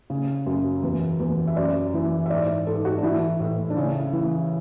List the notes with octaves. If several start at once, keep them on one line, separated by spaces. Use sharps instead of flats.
C#3
F#2
E2
E2
E5
F#2 D5
E3
E5
G#2 D5
G#2 A4
F#4
D4
E3 E4
A2
D4
C#3 C#4
E3